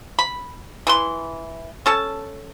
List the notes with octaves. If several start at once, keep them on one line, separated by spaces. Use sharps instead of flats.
B5
E3 B4 C6
C#4 A4 A5